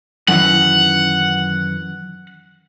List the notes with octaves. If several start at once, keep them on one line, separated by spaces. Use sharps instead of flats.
F#2 D#3 E3 F#5